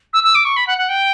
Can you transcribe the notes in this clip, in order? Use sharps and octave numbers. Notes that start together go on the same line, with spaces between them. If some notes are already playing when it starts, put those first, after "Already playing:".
E6
E6
D6
C#6
B5
F#5
F#5
G5